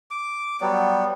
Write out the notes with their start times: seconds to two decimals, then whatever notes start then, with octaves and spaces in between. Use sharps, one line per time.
0.11 D6
0.61 F#3 G3 B3